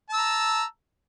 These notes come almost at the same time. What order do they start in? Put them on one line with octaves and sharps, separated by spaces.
A5 E6 A#5